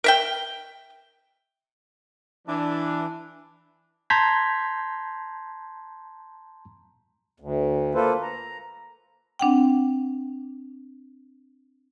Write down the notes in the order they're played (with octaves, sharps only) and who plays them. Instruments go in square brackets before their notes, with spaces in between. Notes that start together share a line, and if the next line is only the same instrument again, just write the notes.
[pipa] A#4 E5 G5
[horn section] E3 D4
[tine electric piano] A5 A#5 C6 G6 G#6 B6
[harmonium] D2
A#3 F4 A4 B4 C5
A#5
[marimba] C4 D4 F#5 G5